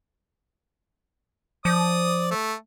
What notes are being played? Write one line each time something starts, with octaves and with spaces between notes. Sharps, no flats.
F3 D5 D#6
A3